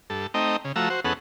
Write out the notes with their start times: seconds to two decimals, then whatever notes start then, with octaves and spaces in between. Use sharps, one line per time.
0.10 G2 A4
0.34 A3 C4 D#4 D#5 G5 A#5
0.64 C#3
0.76 F3 A3 F#4 A#5 E6
0.90 F#4 C5
1.05 E2 B3 C#4 G#4 A4 F#5